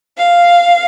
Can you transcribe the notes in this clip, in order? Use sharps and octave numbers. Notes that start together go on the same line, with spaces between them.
F5